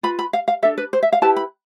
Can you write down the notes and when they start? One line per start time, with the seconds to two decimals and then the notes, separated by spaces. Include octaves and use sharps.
0.03 F4 B4 B5
0.19 B5
0.33 F5
0.48 F5
0.63 D4 A4 E5
0.78 B4
0.93 C5
1.03 E5
1.12 F5
1.22 E4 G4 B4 A5
1.36 B5